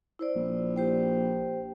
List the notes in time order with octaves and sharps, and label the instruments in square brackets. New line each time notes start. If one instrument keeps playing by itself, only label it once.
[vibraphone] E4 C5 D5
[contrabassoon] A#1
[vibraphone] G4 C5 G5